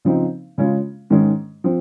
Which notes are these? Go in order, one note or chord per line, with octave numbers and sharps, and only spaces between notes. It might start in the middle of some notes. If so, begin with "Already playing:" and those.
C#3 F3 C4 D#4
C#3 G#3 C#4 F4
G#2 D#3 G#3 C#4
F3 C4